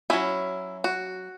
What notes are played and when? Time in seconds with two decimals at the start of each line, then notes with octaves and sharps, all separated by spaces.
0.10 F#3 C#4 E4
0.84 F#4